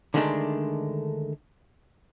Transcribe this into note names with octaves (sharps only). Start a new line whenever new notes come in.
D3 D#3 G#3 A3 C4 D4